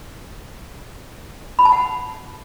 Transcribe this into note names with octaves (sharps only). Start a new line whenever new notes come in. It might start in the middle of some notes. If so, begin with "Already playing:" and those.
B5
A5
F#5